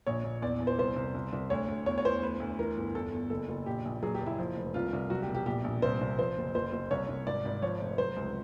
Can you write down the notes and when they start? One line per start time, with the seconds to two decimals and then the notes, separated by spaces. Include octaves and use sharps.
0.07 A#1 C#5
0.24 A#1
0.42 E2 D5
0.60 E2
0.67 C5
0.78 C2 C5
0.96 C2
1.15 C2
1.32 C2
1.50 D2 C#5
1.68 D2
1.86 E2 C#5
1.98 C#5
2.04 E2 C5
2.22 D2 B4
2.40 D2
2.59 E3 A#4
2.77 G1
2.95 E2 A4
3.13 E2
3.30 F#1 A4
3.49 F#1
3.66 A#1 G4
3.85 A#1
4.02 F#3 G#4
4.15 G4
4.20 F#1
4.26 E4
4.38 F3
4.57 F1
4.74 C2 F4
4.93 C2
5.10 F#3 F#4
5.22 G4
5.28 E1
5.35 G4
5.46 A#1 G4
5.64 A#1
5.82 C2 C5
6.01 C2
6.18 F3 C5
6.37 F#1
6.55 F#1 C5
6.72 F#1
6.91 C2 C#5
7.08 C2
7.27 G#1 D5
7.45 G#1
7.62 F3 C#5
7.81 F1
7.98 F#3 C5
8.17 C#2